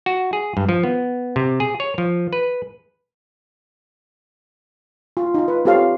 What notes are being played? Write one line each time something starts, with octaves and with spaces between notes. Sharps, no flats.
F#4
G#4
G2
F3
B3
C3
G#4
C#5
F3
B4
F4
D#4 F4
B4
C4 F4 G4 A4 C#5 F5